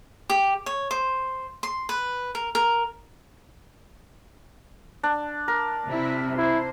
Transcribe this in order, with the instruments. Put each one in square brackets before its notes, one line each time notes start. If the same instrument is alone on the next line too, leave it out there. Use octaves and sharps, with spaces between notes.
[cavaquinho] G4
C#5
C5
C6
B4
A#4
A#4
[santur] D4
A#4
[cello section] C3 E4
[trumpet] E4 [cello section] C5